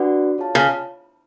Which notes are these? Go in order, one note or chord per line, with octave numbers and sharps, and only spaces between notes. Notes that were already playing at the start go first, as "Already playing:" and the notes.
Already playing: D4 F#4 B4 D5 F#5
F4 G#4 C#5 F5 A5
C#3